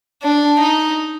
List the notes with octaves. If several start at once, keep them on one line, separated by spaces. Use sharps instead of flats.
D4
D#4